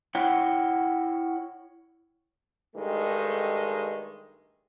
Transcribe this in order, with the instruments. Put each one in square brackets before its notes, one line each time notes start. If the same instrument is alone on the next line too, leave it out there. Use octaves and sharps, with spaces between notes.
[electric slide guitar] E4 C#5 F#5 G5
[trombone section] G2 D#3 G#3 A3